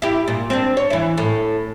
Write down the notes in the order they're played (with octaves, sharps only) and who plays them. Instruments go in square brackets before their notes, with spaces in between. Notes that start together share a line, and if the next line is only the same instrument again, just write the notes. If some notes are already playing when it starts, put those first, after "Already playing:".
[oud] E4 G4
A#2
C4 D4
C#5
E3 E4
A2